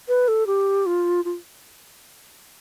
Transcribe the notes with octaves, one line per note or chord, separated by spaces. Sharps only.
B4
A4
G4
F4
F4